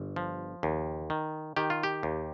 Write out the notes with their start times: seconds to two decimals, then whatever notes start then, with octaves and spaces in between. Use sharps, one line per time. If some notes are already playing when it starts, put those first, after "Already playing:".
Already playing: G1
0.16 F3
0.63 D#2
1.10 D#3
1.56 D#3 G4
1.70 F4
1.83 G4
2.03 D#2